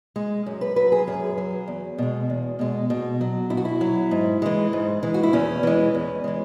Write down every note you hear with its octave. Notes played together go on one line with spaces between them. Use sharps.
G#3
F#2
B4
F#3 B4
G#4
F#2 G#4
F#3
E2
B2 G#3
E2
B2 G#3
B2
F#3
B2 E4
F#4
E4
F#3
G#2
E3 G#3
G#2
E3 G#3
F#4
E4
E2 C#4
E3 G#3
E2
E3 G#3